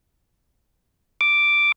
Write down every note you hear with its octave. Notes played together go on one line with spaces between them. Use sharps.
D6